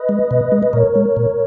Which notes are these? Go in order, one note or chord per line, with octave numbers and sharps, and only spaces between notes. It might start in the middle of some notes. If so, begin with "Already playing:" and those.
Already playing: B4 D#5
G#3
B2
G#3
B4
A#2 A#4 C#5
G#3
A#2